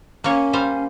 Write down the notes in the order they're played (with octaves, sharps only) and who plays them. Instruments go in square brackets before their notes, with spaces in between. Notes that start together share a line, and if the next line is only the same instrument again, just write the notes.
[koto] A#3 C#5 [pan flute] C#4
[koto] G3 C5 F5